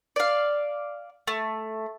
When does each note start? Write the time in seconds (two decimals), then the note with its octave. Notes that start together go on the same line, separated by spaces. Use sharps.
0.16 D5 F5
1.27 A3